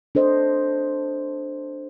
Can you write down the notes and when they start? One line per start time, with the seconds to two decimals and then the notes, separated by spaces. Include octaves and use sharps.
0.15 D4 A4 C5 D#5